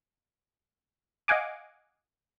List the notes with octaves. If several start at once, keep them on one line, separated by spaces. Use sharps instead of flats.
D#5 F5 F#5 G#5 D6